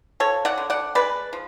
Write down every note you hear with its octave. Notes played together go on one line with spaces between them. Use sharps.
F3 A4 C#5
D5 F#5
D3
D5 F#5
G#3 B4 D5
F3